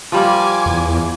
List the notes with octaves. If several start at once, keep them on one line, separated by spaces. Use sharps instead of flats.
F3 G3 A#3 G#5 D6
E2